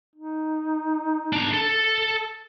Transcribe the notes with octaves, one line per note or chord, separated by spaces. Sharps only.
D#4
D4 A#5
A4